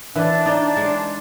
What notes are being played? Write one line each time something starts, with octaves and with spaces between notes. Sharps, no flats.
E3 D4
D#4
D4
G#3